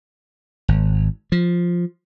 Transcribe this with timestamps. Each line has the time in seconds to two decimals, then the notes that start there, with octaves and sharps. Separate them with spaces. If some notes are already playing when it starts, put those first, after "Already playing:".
0.68 G#1
1.32 F3